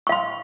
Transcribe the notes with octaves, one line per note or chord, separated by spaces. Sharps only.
F5 C6 C#6